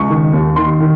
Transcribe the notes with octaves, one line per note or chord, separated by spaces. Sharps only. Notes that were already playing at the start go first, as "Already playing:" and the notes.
Already playing: C#2 C#6
D#3
D#2
D#3 C6
D#3